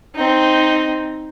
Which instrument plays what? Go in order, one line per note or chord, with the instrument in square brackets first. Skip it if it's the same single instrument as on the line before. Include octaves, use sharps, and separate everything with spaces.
[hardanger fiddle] C4 D#4